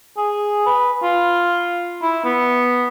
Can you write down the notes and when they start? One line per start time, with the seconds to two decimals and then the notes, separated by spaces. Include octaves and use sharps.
0.18 G#4
0.66 B4
1.03 F4
2.02 E4
2.25 B3